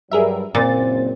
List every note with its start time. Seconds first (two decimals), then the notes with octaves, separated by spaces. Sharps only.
0.11 G2 F#3 G3 G#4 A#4 E5
0.55 F#1 A#2 C4 A6